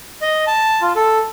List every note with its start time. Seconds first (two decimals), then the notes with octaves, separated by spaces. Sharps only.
0.22 D#5
0.47 A5
0.81 F4
0.96 A4